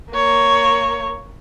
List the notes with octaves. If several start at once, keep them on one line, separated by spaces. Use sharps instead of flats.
A#3 C#5